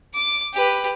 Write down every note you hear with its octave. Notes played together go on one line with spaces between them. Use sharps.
D6
G4 B4